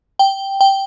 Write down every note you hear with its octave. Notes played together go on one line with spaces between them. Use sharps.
G5
G5